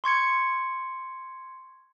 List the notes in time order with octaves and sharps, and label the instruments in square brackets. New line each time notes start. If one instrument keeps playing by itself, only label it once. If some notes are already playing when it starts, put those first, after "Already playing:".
[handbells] C6 C#6 G#6 C#7